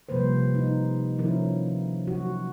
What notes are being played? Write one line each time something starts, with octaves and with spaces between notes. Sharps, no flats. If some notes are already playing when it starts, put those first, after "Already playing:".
C3 F3 G3 A#3 B4 C5
D#4
C3 D#3 F3 C#4 E4 A#4
F#3 F#4